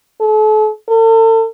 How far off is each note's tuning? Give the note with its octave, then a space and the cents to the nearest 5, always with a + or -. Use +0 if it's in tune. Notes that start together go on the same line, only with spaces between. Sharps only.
A4 -40
A4 +40